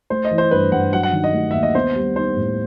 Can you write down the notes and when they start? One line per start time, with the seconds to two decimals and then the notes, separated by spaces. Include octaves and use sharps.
0.10 A3 C5
0.25 D#5
0.31 E3
0.38 C5
0.51 G2 B4
0.72 G2 F#5
0.92 F#3 F#5
1.03 F#5
1.13 D#3
1.24 D#5
1.33 A3
1.51 D#2 E5
1.63 D#5
1.75 B3 C5
1.96 G3
2.16 D#4 C5
2.36 A2